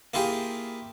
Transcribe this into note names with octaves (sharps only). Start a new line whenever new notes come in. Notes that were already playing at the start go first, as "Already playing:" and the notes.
A#3 E4 F4 G4 G#4